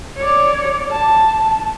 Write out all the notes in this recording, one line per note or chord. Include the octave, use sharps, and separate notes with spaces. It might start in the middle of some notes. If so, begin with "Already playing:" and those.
C#5 D5
A5